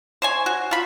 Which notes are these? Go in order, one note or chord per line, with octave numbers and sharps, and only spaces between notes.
C5 C#5 G#5
F#4
F4 B5